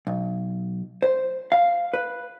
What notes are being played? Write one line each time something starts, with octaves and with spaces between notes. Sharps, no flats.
B1
C5
F5
B4